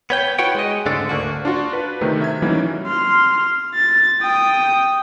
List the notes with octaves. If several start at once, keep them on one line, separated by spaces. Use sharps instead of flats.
B3 C#5 G5
E4 F#4 B4 C#5 F#5 G5
G#3 D#5
C#2 G#2 D3 A3 D4 A4
D2 A#3 F#4
D4 F4 F#4
B4
C3 D#3 A3 C4
E5 G#6
E3 F#3 G3 A#3 C#4 D#4
C6 F6
A6
G5 D#6